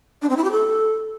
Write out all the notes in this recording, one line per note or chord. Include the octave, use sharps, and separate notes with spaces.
D4
C4
E4
G4
A4